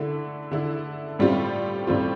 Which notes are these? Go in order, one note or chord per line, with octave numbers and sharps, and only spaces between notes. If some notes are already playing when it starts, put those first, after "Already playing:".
Already playing: D3 A3 E4
D3 A3 E4
A2 G3 C4 F4
A2 G3 C4 F4